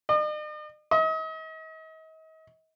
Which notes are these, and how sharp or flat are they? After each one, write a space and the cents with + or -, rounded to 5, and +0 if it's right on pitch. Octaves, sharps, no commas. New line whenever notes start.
D#5 -45
D#5 +40